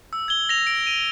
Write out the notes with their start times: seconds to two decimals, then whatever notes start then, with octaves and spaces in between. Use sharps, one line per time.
0.13 E6
0.28 G#6 G7
0.49 A#6 F7
0.67 D7
0.87 D#7